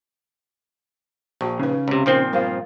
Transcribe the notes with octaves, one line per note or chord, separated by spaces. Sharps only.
A#1 F#4 G5 C#6
C#3 D#4 B4
C#2 C3
A#2 F3 C4 D#4 A#4 C5
G2 F4 A#4 C5 F5